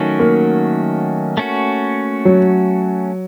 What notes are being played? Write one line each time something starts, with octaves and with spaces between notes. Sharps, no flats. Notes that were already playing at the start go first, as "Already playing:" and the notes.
Already playing: D#3 F#3 A3 C#4 F#4
A#3
A3 C#4 F#4
F#3